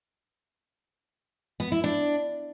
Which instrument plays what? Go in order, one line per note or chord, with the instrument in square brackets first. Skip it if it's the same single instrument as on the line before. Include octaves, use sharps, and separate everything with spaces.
[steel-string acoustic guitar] B3
E4
D4